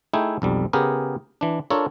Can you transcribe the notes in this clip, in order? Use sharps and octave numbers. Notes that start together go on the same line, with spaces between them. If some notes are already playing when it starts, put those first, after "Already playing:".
A3 D#4 E4 G#4 G5
B1 F2 G3
C#3 B3 G4 G#4 A#4
E3 D4
D4 F4 A4 A#4 C#5